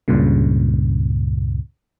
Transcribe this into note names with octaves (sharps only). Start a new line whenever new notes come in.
C#2 G2 A#2 C#3